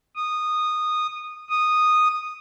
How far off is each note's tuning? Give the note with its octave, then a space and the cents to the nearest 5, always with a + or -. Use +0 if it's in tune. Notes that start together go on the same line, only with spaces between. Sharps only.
D#6 -15
D#6 -10